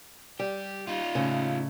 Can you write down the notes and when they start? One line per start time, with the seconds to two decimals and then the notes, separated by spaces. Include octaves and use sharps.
0.39 G3 G4
0.87 D#4 F4
1.15 A2 C#3